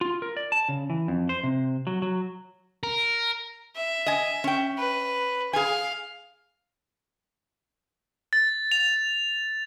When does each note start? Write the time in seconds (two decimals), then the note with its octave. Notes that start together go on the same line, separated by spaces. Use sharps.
0.01 F4
0.22 A#4
0.37 D5
0.52 A5
0.69 C#3
0.90 E3
1.08 F2
1.29 C5
1.44 C3
1.87 F#3
2.02 F#3
2.83 A#4
3.76 E5
4.06 D#5 G#5
4.44 C#4 G5
4.78 B4
5.53 G#4 F5 G#5
8.33 A6
8.71 F7